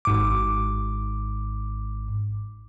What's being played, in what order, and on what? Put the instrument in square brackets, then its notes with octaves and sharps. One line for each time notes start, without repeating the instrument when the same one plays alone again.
[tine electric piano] G#1 G#2 D6